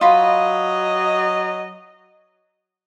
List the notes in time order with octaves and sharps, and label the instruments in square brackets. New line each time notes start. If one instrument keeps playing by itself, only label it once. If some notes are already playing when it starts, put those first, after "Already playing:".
[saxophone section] F#3 D#5 [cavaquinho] F4 B5